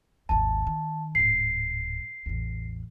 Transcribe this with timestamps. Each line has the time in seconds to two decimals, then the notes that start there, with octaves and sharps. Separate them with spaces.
0.29 G#1 D#2 A5
0.67 D#3
1.15 D1 G#2 C7
2.26 A1 E2